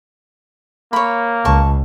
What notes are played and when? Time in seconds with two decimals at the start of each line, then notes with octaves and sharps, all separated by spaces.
0.93 A#3 C#5 B5
1.45 C#2 A5 C#6